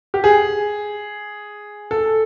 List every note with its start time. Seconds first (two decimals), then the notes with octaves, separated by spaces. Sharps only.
0.14 G4
0.24 G#4
1.91 A4